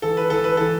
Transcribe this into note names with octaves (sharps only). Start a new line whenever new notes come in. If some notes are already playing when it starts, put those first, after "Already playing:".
E3 A4
B4
E3 A4
B4
E3 A4